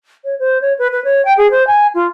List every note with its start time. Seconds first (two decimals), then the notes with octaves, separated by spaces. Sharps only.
0.25 C#5
0.39 C5
0.61 C#5
0.79 B4
0.92 B4
1.04 C#5
1.25 G5
1.37 G#4
1.51 C5
1.67 G#5
1.94 F4